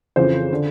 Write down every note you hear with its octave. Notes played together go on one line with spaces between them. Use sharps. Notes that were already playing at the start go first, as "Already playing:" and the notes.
F2 C#3 E3 C5
D3